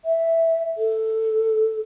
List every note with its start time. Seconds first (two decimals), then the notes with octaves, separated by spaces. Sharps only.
0.05 E5
0.77 A4